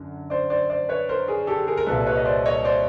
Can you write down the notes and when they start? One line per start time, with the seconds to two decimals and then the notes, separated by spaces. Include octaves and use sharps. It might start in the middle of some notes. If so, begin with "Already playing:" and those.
Already playing: F#2 D3
0.30 C5 D5
0.50 C5 D5
0.70 C5 D5
0.89 B4 C#5
1.09 A#4 C5
1.28 G#4 A#4
1.47 G4 A4
1.67 G#4 A#4
1.77 A#4
1.86 C2 A#2 G3 A4 B4
2.07 B4 C#5
2.16 D#5
2.25 C5 D5
2.46 C#5 D#5
2.64 C5 D5